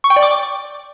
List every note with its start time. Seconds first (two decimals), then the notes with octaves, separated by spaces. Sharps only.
0.04 C#6
0.10 G5
0.16 D5
0.23 D6